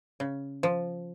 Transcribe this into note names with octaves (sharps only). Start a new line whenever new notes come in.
C#3
F3